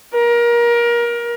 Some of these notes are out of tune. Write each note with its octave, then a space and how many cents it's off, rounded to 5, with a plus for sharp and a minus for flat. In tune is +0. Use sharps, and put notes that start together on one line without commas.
A#4 +25